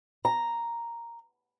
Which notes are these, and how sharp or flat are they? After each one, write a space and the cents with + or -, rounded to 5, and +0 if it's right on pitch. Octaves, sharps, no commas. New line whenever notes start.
A#5 +0